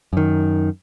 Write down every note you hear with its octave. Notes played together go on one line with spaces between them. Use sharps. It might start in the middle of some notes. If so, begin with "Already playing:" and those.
F#2 D#3